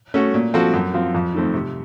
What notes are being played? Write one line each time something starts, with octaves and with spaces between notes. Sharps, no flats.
A3 C#4 F#4
A#2
F3 C4 F#4 A4
F#2
F3 C4 F4
F2
D#3 A3 C4
C3